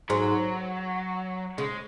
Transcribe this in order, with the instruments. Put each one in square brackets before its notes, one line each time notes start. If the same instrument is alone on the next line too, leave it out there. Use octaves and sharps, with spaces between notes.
[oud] G#2 [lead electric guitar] F#3
[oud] C#3 [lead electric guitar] G#3